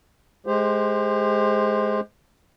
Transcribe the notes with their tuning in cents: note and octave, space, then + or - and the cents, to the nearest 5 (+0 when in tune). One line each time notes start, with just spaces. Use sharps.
G#3 +20 G4 +40 C5 -5